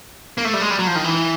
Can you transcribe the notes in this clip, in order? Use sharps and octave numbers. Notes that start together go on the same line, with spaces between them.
A#3
A3
G3
G#3
G3
F#3
F3
D#3
E3